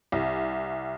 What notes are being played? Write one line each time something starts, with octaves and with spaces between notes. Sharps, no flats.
C2